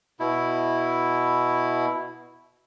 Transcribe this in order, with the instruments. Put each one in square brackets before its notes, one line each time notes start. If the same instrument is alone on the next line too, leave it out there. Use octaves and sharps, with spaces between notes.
[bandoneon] B2 E4